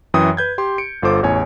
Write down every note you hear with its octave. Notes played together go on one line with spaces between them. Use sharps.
F#2 E3 G5 D#6
B4 G6 G#6
G4 C6
C#7 D7
G1 F4 A4 C5 D6
A1 E2 C#5 G#5